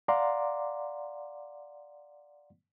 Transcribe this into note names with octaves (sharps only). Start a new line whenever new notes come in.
D5 F5 F#5 A#5 C6 D6